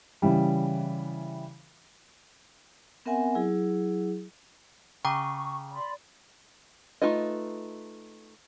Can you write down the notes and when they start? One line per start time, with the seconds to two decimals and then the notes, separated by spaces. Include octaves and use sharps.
0.22 C#3 E3 G3
3.06 B3 C4 A#4 E5 F#5 G#5
3.35 F#3 E4 G#4
5.05 C#3 G5 A#5 C#6 D6
5.72 D5 B5 C6
7.02 A3 D#4 F4 B4 D#5